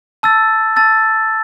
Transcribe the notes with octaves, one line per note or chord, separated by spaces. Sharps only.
A5 E6 A6
A5 E6 A6